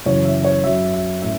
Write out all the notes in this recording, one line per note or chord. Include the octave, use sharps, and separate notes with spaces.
F#2 C#3 E3 C#4 C#5
E5
C#5
F#2 F#3 C#4 E5
E5
A2 A3 C#4 E5